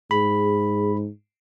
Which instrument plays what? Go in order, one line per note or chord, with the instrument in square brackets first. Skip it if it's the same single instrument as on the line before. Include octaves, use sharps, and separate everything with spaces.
[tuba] G#2 [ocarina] G#4 [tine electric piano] B5